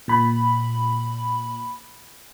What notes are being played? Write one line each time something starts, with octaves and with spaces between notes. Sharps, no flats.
A#2 B5